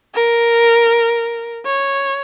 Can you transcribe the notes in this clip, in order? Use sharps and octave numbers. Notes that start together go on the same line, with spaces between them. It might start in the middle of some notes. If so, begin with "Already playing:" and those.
A#4
C#5